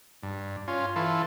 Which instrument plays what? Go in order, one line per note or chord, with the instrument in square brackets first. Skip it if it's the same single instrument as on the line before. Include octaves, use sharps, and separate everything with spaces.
[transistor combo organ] G2
C#4 F4
E3 F4 A4